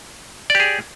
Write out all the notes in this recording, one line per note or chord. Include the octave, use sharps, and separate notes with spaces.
G4 G#4 D5